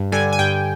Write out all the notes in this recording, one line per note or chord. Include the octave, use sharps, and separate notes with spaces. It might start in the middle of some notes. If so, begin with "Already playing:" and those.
Already playing: G2
D3 G3 G#5
G#5
G2 G5